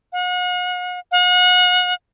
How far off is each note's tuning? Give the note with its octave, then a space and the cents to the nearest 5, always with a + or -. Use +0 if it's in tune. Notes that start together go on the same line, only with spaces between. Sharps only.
F#5 -40
F#5 -35